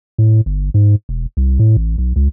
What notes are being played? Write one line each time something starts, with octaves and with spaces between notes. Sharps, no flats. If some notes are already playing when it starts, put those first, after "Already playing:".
A2
G1
G#2
E1
C2
A2
A1
B1
C#2